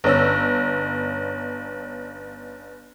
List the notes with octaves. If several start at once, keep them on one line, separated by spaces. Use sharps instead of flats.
G1 C#4 E6